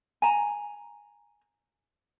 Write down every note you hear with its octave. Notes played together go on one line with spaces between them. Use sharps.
G#5 A#5